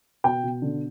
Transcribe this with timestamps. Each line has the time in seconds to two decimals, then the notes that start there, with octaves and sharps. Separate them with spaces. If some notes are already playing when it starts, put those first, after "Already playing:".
0.24 B2 G5
0.43 B2
0.62 D3